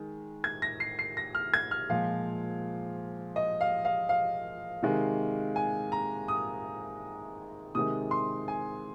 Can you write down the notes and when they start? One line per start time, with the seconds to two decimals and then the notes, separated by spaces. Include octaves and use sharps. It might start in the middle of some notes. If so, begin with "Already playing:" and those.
Already playing: D#3 G#3
0.44 G#6
0.62 A#6
0.80 C7
0.99 C7
1.17 A#6
1.35 F6
1.54 G#6
1.71 F6
1.90 A#2 F3 G#3 F5
3.36 D#5
3.61 F5
3.85 F5
4.09 F5
4.83 C3 D#3 G#3
5.56 G#5
5.92 A#5
6.28 D#6
7.75 C3 D#3 G#3 D#6
8.11 C6
8.48 G#5